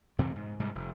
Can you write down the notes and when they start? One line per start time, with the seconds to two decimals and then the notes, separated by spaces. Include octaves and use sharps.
0.19 F2 C3 E3 C4
0.36 G#2
0.60 G#2 C3 G3
0.75 F1